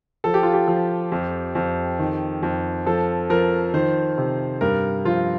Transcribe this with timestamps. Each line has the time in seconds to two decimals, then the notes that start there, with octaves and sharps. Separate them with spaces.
0.24 F3 A4
0.34 G4
0.43 F4
0.53 G4
0.68 F3
1.12 F2
1.55 F2
1.99 D#3
2.43 F2
2.86 F3 A4
3.30 F3 A#4
3.74 D#3 C5
4.18 C3
4.61 G2 A#4
5.05 F3 F4